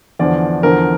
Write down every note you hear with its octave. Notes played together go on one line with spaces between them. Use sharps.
E2 D3 F3 D5
E2 D3 F3 A#4